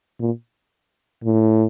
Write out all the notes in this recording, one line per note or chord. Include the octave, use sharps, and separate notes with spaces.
A#2
A2